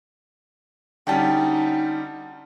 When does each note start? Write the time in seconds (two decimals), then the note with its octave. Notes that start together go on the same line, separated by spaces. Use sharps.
1.07 D3 G3 C#4 D#4 F#4 G5 A5